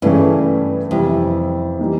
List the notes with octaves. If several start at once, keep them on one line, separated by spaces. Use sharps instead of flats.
G2 C#3 E3 A3 C#4 E4
F2 C3 E3 G3 C4 E4
E3 G3 A#3 D#4